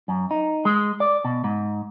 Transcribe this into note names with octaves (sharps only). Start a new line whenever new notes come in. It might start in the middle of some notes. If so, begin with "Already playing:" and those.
F#2
D#4
G#3
D5
B2
G#2